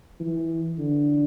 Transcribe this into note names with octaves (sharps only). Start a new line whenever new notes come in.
E3
D3